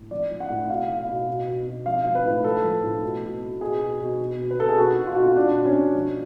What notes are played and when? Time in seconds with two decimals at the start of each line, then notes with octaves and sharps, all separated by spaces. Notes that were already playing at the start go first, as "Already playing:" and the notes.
Already playing: A2
0.11 F3 D5
0.31 F3
0.40 F#5
0.50 A2
0.69 B2 F5
0.89 B2
0.98 F5
1.08 B2
1.28 B2
1.47 B2
1.66 B2
1.86 F3 F5
2.05 F3
2.15 B4
2.25 A2
2.44 F3 A4
2.64 F3
2.84 A2
3.03 B2
3.22 B2
3.42 B2
3.61 B2 G#4
3.81 B2
4.00 B2
4.19 B2
4.39 B2
4.51 B4
4.58 B2 A4
4.69 G#4
4.78 B2 F#4
4.97 B2
5.07 F4
5.15 B2 F#4
5.22 F4
5.36 B2 D4
5.56 B2
5.65 C#4
5.75 B2
5.94 F3